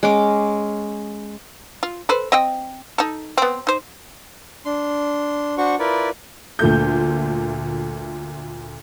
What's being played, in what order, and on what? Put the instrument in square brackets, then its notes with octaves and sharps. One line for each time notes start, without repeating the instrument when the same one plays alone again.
[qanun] G#3 C#4 D6
[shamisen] F4
A4 B4 C5
C4 D#5 G5
D#4 A4
B3 C4
D#4 C5
[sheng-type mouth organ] D4 C6
D4 F#4 C5 F#5 C#6
E4 F4 A#4 B4 D5
[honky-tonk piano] D2 A#2 A3 G6